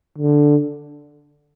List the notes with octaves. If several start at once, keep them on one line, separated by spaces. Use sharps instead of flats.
D3